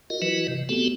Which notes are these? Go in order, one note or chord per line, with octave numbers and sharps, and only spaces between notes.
F4 F#4 A#4 D#5
E3 F#3 E4 F#4 B4 D#5
C3
A3 B3 C4 F#4 G4 A4